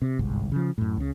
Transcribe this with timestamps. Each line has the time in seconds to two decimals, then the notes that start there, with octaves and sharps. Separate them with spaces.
0.02 C3
0.19 G1 C2 G#2
0.52 C#3 F3
0.78 F#2 A2
0.97 C#2 C#3